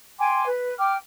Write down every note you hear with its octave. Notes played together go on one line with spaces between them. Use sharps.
G5 G#5 C6 D6
B4
G5 D6 F6